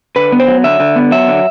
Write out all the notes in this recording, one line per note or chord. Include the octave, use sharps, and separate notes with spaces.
D3 B4
B3
C5
F#3
D3 E5
D3
B3
F#3 E5
D3